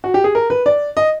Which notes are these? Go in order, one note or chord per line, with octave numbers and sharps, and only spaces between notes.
F#4
G4
G#4
A#4
B4
D5
D#5